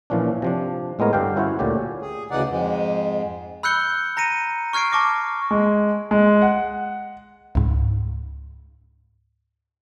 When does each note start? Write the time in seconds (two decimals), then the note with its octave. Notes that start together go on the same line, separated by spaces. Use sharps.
0.10 A#2 E3 F3 C#4 D4
0.42 C3 F3 D4
0.99 A2 G#3 B3 A#4 C#5
1.13 G2 D3 D4 G4 F5 G5
1.36 C#4 E4 F#4 C5 C#5
1.59 D2 A#2 D3 C#4 G4
2.02 G#4
2.31 D2 C#3 E3 D#4 D5 F#5
2.49 F2 G#2 G#3
3.63 B5 E6 F#6 G6 C#7 G7
4.17 A#5 A#6 C#7 D#7
4.73 C#6 F6 G#6 C7 D7
4.92 A5 C#6 D6 A#6
5.51 G#3
6.11 G#3
6.42 F#5
7.55 C#2 G#2